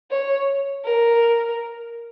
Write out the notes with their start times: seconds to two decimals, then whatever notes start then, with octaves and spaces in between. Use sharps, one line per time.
0.11 C#5
0.85 A#4